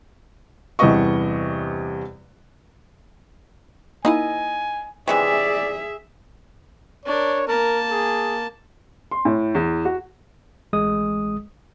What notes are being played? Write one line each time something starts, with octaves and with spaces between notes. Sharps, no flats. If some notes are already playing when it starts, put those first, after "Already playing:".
E2 G2 C3 B4 D#5 C#6
A#3 D#4 E4 D#5 G#5
C3 E3 G#3 G#4 D5 E5
D4 A#4 C#5
A#3 A#4 A5
G#4
C6
A2
E2
F#4
A1 G#3 D#6